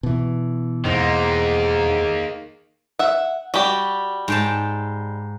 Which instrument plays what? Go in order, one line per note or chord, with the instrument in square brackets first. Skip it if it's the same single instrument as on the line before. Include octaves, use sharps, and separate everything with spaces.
[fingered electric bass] B2 E3
[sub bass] E2 [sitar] G#2 [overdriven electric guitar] D#3 A#3
[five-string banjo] E5 F#5
[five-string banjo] G3 G4 [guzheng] F#4
[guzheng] G#2 G5 A5